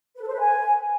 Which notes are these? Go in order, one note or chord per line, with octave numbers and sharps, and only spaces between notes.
B4
A4
C5
B4
G#5